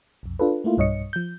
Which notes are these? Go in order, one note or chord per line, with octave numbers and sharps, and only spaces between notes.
B1 F2
D4 F4 A4 B4
A3 A#3 E4 F4
B1 G2 C#5 D#5 C#7
F3 G6